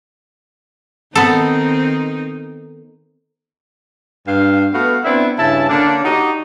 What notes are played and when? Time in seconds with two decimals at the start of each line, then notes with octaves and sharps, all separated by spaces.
1.15 D#3 B3 C4 D#4 A4
4.26 G2 F5
4.73 A3 B3 F#4 B4 F5
5.04 B3 C4 D4 E4
5.38 G2 C#3 E4 A5
5.68 D3 A#3 C#4 D4
6.03 D#4 F#4 G4 D5 D#5